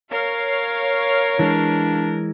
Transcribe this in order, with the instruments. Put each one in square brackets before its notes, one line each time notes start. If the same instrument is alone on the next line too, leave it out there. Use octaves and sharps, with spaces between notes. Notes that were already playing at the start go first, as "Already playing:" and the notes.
[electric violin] A#4 [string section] C#5 F5
[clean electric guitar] E3 G#3 [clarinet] D4